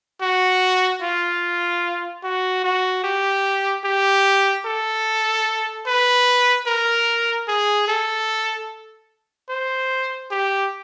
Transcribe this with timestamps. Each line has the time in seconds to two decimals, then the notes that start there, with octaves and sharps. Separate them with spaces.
0.21 F#4
1.02 F4
2.23 F#4
2.64 F#4
3.04 G4
3.84 G4
4.66 A4
5.86 B4
6.67 A#4
7.48 G#4
7.88 A4
9.49 C5
10.31 G4